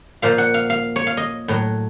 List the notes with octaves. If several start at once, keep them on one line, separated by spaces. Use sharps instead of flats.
A#2 F3 F5
F#5
F5
F5
C#5
F5
D#5
A2 F#3